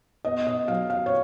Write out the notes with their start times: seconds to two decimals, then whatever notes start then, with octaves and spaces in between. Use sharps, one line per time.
0.25 B3 D#5
0.47 D#5
0.68 F#3 F5
0.90 F5
1.06 C#5